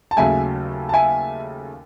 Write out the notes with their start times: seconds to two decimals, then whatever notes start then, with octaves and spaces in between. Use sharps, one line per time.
0.11 A5
0.17 D#2 C#3 F#3 A3 E5 G#5
0.89 A5
0.93 E5 G#5